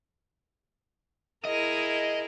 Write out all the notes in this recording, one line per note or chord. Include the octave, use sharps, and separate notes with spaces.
E4 G#4 A#4 D#5